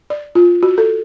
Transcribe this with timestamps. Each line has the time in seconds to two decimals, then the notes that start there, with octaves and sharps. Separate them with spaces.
0.10 D5
0.35 F4
0.63 F#4
0.78 A4